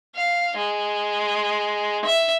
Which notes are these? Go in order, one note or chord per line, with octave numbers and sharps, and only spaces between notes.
F5
G#3
E5